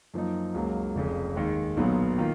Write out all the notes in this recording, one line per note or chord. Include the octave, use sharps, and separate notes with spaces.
F#2 F3 A#3 D#4
C#2 C#3 F#3 A#3
F1 F2 C#3
D#2 D#3 G#3
B1 A#2 F#3 B3 F4
D#3 A#3 F4